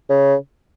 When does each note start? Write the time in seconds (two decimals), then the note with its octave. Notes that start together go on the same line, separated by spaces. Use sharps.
0.10 C#3